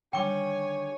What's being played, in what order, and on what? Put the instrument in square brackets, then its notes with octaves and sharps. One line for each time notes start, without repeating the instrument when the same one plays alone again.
[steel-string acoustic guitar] D3 D#3 G3 [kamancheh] C#5 G#5 [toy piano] G5 D6